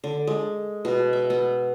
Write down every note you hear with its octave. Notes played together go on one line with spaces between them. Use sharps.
D3
G#3
B2
E5
B3